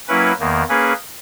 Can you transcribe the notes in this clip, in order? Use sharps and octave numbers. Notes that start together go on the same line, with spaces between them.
F#3 A#3 C#4 E4 B4
E2 D#3 A#3
A#3 C#4 G#4 B4